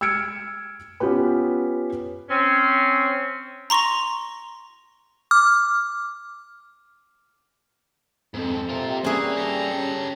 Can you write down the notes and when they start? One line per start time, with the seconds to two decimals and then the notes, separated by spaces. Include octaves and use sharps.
0.01 E6 F6 G#6 C#7 D7
1.00 B3 C#4 F4 G4 B4
2.30 C4 C#4
3.70 A#5 C6 C#6 A#6 F7
5.31 D6 F6
8.34 F2 G#2 C4 A4
8.69 C3 F4 A#4
9.04 G3 A#3 C#4 G#4 B4 E5
9.36 G4 A4 A#5
9.74 C#4